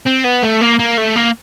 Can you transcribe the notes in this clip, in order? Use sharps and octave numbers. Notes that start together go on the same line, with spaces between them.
C4
B3
A3
A#3
A#3
A3
A#3